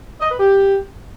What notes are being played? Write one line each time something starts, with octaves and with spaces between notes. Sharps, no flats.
D#5
B4
G4